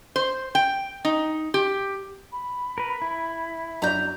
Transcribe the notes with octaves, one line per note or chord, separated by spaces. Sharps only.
C5
G5
D#4
G4
B5
A#4 B4
E4
F#2 D4 D5 A#5 G6